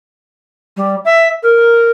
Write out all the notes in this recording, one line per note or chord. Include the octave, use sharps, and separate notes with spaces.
G3
E5
A#4